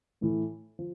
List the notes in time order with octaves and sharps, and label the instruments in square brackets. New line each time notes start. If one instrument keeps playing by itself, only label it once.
[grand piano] A2 E3 A3 E4
F3